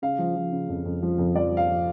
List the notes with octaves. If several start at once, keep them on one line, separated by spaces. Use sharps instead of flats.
C#3 F5
F3
F3
C#3
F2
F2
F3
F2
F3 D5
F3
F5
F3